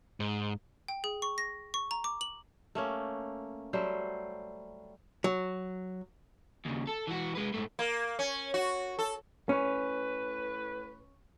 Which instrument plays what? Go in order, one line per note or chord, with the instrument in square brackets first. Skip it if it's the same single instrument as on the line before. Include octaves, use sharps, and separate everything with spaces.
[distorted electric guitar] G#2
[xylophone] G5
G#4
C#6
A#6
C#6
A#5
D6
F#7
[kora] A3 A#3 C#4
F#3 G3 A3 C5
[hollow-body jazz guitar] F#3
[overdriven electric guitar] D#2 C#3
A4
E3 F#4
G#3 B4
G#2 A3
[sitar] A#3
C#4
F#4
A4
[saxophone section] A2 B4 [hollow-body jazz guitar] C#4